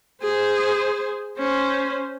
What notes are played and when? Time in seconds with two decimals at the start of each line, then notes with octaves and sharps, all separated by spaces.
0.22 G#4 C5
1.39 C#4 C5